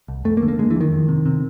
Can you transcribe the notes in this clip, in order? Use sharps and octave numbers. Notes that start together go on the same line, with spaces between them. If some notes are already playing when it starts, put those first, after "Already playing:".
C2
F2 A3
A#3
D3
A#3
D3 G#3
E3
F2 D#3
F2
C3
C3